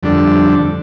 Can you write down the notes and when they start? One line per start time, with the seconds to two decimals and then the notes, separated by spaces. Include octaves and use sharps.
0.03 F2 D3 G3 D4 A4